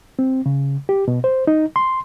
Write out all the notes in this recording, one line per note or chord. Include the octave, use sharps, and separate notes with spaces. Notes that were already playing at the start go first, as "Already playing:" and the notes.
C4
C#3
G4
B2
C5
D#4
C6